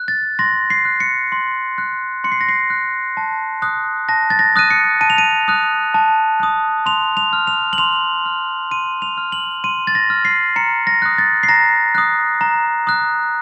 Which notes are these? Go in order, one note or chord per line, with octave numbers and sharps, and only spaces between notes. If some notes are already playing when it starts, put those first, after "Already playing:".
Already playing: F#6
A6
C6 A#6
C7
F#6
C#7
C6
F#6
C6 C#7
C7
A#6
C7
F#6
A5
D#6 F#6
A5 A#6
A6
A#6
D#6 F#6 D#7
C#7
A5 D#7
F7
D#7
D#6 F#6
A5
D#6 F#6
C6 F7
F7
F6
F7
F#7
C6 F7
F6
C6 D#7
F7
F6
F#7
C6 D#7
A6
A#6
F6
C7
A#5 C#7
A#6
D#6 F#6
A6
C7
A#5 A#6
D#6 F#6
A#5
D#6 F#6